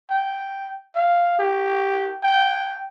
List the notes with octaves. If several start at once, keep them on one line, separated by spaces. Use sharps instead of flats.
G5
F5
G4
G5